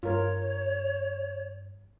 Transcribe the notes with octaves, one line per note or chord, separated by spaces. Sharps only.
G2 F4 A#4 C#5